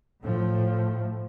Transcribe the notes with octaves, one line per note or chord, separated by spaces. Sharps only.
A2 F3